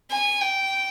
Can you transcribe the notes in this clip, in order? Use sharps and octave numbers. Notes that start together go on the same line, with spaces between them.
G#5
G5